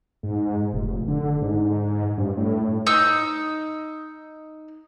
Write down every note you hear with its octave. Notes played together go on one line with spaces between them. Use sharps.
G#2
F1
D3
G#2
G2
A2
D#4 E6